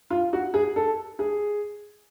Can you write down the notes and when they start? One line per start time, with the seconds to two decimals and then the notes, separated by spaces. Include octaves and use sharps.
0.10 F4
0.33 F#4
0.54 G#4
0.76 A4
1.19 G#4